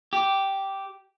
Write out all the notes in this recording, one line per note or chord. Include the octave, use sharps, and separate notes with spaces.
G4